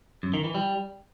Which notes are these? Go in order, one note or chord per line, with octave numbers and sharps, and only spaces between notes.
F#2
D#3
E3
G3